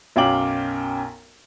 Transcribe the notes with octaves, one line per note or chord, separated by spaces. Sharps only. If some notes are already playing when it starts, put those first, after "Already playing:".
B1 F#2 F5 G5 D6 F#7